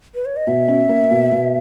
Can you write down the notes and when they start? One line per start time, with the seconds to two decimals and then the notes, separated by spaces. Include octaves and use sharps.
0.15 B4
0.25 C#5
0.36 D#5
0.47 B2 E5
0.68 C#4
0.89 A#3
1.11 B2
1.32 B2